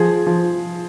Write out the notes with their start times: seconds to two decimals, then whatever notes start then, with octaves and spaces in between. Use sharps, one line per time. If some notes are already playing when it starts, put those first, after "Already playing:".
Already playing: F3 G#4
0.26 F3